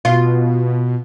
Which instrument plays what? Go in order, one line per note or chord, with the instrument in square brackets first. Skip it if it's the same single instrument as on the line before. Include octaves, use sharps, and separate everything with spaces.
[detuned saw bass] B2 [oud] F4